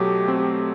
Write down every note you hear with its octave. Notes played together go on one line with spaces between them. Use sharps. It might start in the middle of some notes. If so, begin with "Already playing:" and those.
Already playing: B2 F#3 A3 G4
C4